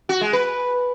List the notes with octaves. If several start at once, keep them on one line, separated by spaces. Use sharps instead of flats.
F#4
G#3
B4